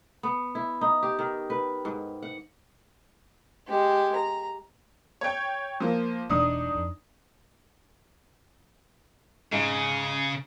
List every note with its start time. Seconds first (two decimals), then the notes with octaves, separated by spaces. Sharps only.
0.23 B3
0.55 E4
0.81 D#4
1.03 G4
1.19 D#3
1.50 B4
1.85 G#2
2.22 F#5
3.68 G#3 G4
4.16 A#5
5.21 C#5 G5
5.80 F3 A#3
6.30 E1 E3 G#3 D4 D#4 D#6
6.74 F2
9.52 G#2 C#3